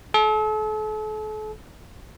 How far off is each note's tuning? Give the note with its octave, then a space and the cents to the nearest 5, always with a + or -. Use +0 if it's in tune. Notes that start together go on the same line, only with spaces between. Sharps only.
A4 -40